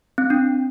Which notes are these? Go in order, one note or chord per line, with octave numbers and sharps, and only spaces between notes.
C4
D4